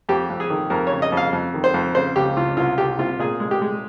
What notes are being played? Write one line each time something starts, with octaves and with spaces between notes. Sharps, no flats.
F2 G4
F2
G#4
D#3
F2 A#4
C#5
C#3
D#5
F2
F5
F2
D#3
C5
F2
C#3 C5
C#2 G4
C#2 F4
C2 F4
C2 G4
C3 F4
A#2 G#4
G#3
G4
G#3